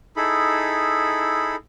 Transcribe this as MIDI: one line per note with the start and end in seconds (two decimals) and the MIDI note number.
0.16 1.56 63
0.16 1.56 64
0.16 1.56 68
0.16 1.56 69
0.16 1.56 83